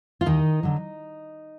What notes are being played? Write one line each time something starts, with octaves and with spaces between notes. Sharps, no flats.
F4
D#2 D#3 D#4
D3 F#3